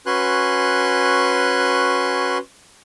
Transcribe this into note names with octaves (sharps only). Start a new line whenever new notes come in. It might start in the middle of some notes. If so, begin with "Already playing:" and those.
C#4 F#4 B4 G#5 C6 F#6